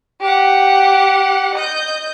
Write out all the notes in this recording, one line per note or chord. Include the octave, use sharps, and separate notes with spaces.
G4 F#5
D#5 G6